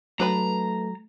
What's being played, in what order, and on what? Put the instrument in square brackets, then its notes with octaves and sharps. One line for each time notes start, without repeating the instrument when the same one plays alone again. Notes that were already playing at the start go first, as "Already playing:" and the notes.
[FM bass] F#3 [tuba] A3 [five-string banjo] D4 B4 B5 [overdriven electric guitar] A#5